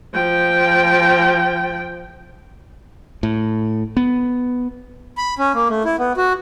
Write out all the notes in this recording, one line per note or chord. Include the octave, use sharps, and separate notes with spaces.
F3 G5
A2
B3
B5
C#4
A#3
A3
E4
B3
F#4